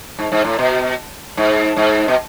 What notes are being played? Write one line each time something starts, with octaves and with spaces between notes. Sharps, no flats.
G#2
G#2
A2
B2
G#2
G#2
B2